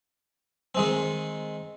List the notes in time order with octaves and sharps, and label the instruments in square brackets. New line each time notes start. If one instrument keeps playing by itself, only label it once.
[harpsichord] D#3 G#3 C4